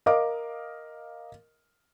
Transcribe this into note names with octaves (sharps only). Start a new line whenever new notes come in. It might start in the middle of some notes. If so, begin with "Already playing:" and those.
A#4 D#5 F5 D6